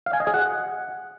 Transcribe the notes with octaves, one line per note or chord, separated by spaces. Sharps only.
F5
G#5
D#5
G#4
F#5